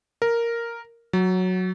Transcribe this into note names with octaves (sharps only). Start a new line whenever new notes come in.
A#4
F#3